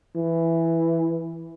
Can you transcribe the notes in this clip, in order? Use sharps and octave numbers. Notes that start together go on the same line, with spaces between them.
E3